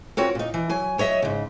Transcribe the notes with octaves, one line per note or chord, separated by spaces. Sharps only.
C4 F4 F#4 A#4 C#5
A#2 D#4
E3
F#3 G#5
F#3 C#5 D#5 E5
G#2 C#3